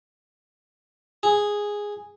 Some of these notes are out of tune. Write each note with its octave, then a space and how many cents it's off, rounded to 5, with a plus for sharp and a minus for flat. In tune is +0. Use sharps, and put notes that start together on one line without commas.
G#4 -5